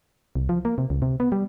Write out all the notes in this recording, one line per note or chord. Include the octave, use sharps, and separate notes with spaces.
C2
F3
A#3
C3
C#2
C3
B3
G3